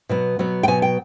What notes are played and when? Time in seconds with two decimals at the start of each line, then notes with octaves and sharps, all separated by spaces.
0.09 B2 F#3 B3
0.39 B2 F#3 B3
0.63 G5
0.68 B2 F#3 B3 G#5
0.82 G5